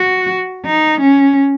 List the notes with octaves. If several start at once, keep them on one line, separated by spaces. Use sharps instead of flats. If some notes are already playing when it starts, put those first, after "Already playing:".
Already playing: F#4
D#4
C#4